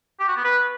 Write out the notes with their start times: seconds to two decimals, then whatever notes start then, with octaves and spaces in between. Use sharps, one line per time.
0.20 G4
0.28 F#4
0.36 B3
0.44 B4